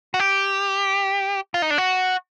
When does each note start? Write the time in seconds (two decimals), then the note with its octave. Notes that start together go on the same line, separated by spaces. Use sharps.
0.14 F#4
0.20 G4
1.54 F4
1.62 D#4
1.70 D4
1.78 F#4